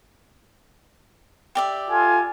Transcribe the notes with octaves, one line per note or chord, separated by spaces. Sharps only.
G4 D5 E5
F4 A4 G#5